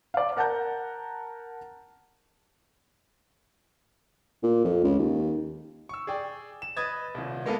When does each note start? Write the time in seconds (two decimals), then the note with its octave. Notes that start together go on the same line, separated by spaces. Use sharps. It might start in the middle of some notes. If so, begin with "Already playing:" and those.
0.14 D5 F5
0.37 A#4 F#5 A5 A#5 G6
4.43 A#2
4.65 F2
4.84 C#2
4.99 D#2
5.89 C#6 E6
6.07 G#4 D5 G5
6.62 E7
6.77 B4 D#5 D#6 G#6 A6
7.14 D#1 C2
7.46 G#3 A#3 B3 A4 B4 F5